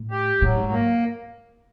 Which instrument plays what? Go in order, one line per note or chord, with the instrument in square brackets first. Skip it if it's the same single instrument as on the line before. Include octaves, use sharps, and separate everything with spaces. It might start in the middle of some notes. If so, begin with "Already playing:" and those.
Already playing: [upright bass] A2
[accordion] G4
[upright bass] A2 [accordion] F#3
[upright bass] G#2
[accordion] A#3